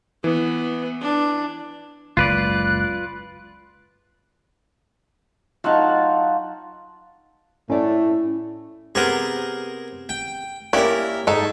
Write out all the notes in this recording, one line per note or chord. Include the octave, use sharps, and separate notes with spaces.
E3 B3
D4
F#1 C#2 F4 B4 D5 F#6
F#3 D#4 F4 F#5 A5
A2 A3 C#4 E4 D5
C3 B3 G#4 A#4 C5
G5
A#3 C#4 E4 G4 A#4 D5
G#2 D#4 A4